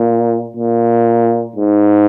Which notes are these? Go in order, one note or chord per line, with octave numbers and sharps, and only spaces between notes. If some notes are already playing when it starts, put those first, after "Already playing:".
Already playing: A#2
A#2
G#2